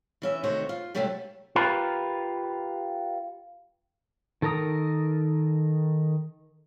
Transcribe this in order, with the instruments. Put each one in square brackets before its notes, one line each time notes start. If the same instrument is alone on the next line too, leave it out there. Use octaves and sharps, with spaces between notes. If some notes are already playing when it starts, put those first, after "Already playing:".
[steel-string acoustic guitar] E3 C#4 E5
D#2 C3 A3 F#4 C5 C#5
F4
C3 F#3 G3 A3 C#4 G4
[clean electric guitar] F4 G4 A#4 B4
[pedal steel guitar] D#3 A4 A#4 A#5 D#6